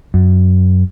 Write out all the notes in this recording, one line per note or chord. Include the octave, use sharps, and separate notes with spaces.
F#2